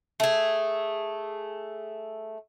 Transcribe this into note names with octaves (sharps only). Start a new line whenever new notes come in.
A3 G#4